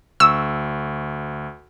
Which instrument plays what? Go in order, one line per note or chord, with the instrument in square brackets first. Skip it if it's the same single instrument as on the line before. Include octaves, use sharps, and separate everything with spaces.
[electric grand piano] D2 C#6 [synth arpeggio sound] E6